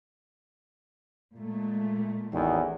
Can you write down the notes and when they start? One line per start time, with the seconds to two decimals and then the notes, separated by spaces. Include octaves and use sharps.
1.35 A#2 G#3 A3
2.32 A1 E2 D#3